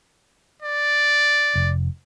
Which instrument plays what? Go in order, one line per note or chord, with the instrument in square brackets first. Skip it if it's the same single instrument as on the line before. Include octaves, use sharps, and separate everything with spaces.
[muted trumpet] D5
[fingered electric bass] F1